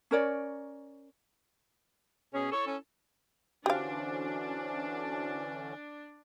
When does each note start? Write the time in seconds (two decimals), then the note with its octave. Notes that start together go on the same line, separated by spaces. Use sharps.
0.11 C#4 A#4 C#5 D5
2.34 B2 C#4 G#4
2.52 E4 A4 C#5
2.67 C#4
3.66 D3 E3 C#4 D4 F#4 G4 C5 F5